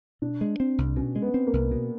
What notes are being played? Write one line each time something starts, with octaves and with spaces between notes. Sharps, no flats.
B2 D4
G#3
C4
C2
B2 C#4
G#3
B3
C4
A#3
C2
B2